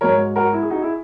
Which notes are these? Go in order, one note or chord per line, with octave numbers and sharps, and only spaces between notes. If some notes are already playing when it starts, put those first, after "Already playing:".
G#2 F#3 A#4 C#5
F#4 A#4
E4
G#4
D#4 F#4
E4 G#4